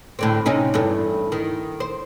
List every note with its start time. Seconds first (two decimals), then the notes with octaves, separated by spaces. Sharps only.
0.19 A2 D3 C4
0.46 C3 C#4 D#4
0.74 E2 G2 A3
1.32 D#3
1.80 C5